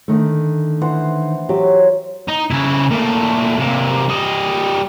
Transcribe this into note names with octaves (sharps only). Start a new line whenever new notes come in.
D3 D#3 A3
E3 C5 F#5
F#3 G4
D#4
C#3 E4
A#2 A3
C3 A#3
G3 D#5